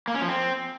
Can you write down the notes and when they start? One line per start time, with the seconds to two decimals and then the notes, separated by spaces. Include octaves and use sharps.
0.08 A#3
0.15 C#4
0.21 F3
0.28 C4